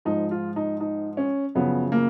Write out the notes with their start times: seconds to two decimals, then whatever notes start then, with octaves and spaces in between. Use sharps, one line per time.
0.05 G#2 F3 D#4
0.31 F4
0.56 D#4
0.80 D#4
1.17 C#4
1.55 F#2 C#3 F3 B3
1.92 A#3